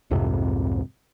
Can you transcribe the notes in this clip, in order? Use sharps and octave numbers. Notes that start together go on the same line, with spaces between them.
C2 F2 G#2 C3